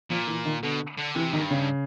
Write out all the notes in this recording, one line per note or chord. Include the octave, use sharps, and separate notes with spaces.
A#2 F3
E3
D#3
B2 D3
D3
C3 E3
G#2 D#3
G2
C#3